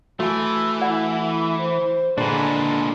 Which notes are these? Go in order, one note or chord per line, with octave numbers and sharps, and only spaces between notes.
E3 A3 F#4 G#5
E4 D5 F#5
C5
A#2 D3 G#3 D4 G#4 B4